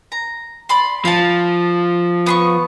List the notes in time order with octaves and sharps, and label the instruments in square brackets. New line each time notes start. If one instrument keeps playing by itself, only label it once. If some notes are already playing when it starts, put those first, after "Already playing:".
[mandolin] A#5
D5 B5 C6
[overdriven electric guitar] F3 [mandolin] F5 A5
[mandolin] B3 C6 C#6